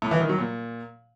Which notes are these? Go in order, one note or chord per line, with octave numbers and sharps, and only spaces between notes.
A2
E3
D#3
F#3
A#2